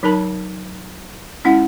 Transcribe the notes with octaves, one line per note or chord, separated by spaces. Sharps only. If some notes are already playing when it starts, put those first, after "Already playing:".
F#3 D#4 A#4 A5 B5
G#3 C#4 E4 F#5